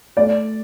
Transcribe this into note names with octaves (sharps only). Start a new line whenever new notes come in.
A3 D5